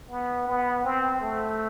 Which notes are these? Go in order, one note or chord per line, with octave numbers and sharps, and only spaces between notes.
B3
B3
C4
A3